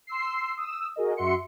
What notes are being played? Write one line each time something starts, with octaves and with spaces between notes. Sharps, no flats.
C6 E6 C7
D#6 E6
F#4 G#4 A#4 D#5
F#2 F#4 E5 C6 C#7